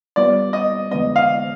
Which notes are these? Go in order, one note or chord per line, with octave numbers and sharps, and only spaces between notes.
G3 B3 F4 D5
D#5
F2 D3 G#3 B3 D#5
F5